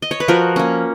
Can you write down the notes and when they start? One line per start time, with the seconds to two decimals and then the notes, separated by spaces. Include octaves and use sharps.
0.02 D#5
0.11 C#5
0.20 B4
0.28 F3 F#4 A#4
0.56 A#3 C#4